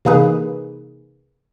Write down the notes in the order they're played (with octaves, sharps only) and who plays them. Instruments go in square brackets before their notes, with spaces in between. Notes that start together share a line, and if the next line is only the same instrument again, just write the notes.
[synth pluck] C3 E3 A#3 D#4 G#4 B4